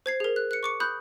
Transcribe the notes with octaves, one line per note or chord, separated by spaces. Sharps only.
C5 G#6 C7
G#4 A#4
F#6
F#6 C#7
C#6 D6 C#7
B5 D#6 F#6 G6